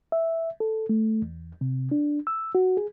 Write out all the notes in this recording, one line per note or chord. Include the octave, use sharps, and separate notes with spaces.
E5
A4
A3
E2
C3
D4
E6
F#4
G#4